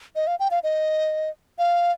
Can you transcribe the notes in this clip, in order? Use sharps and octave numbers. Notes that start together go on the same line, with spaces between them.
D#5
F5
G5
F5
D#5
F5